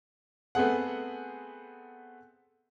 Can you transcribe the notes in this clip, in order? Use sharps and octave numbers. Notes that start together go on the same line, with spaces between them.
A3 B3 C4 G#4 F#5